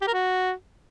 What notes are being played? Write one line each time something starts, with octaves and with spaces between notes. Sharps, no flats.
G4
A#4
F#4